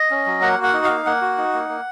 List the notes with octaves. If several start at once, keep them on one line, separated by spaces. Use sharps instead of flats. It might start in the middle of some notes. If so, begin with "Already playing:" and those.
Already playing: D#5
C#4
F#3
A#3 F#5
F#4
F#5
D#4
F5
A#3
A#3 F#5
F#4
D#4
A#3
A#3